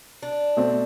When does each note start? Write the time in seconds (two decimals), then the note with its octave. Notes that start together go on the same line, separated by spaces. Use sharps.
0.22 D4
0.57 B2 A3 C4